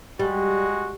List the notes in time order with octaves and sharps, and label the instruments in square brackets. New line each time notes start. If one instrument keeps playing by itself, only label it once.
[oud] G3 [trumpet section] G#3 F#4